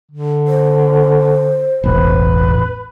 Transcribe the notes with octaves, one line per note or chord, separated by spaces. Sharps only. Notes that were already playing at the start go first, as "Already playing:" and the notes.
D3
C5
E1 A1 B4